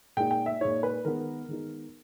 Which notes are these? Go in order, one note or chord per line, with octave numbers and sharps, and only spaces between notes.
A#2 G#3 D#4 G5
G5
E5
A#2 G#3 D#4 C#5
B4
D#3 G#3 B3 D#4 A#4
D#3 G#3 B3 D#4